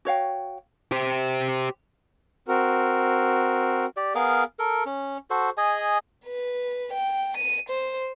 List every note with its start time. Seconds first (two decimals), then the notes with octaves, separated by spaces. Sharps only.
0.05 F#4 C#5 F5 G5
0.92 G4 C5
2.48 C4 F#4 A#4
3.97 G4 D5
4.15 B3 G#4 A#4 F5
4.59 A4 A#4
4.86 C#4
5.30 F#4 A4 C5
5.57 G#4 D#5 G#5
6.25 B4
6.93 G5
7.38 D#7
7.70 C5